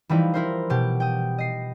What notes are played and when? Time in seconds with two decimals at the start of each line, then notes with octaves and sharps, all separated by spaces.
0.09 E3 F3 G3 D#4 E4
0.34 E4 A#4 C5
0.70 B2 G4
1.00 G5 D#6
1.38 D#5 C7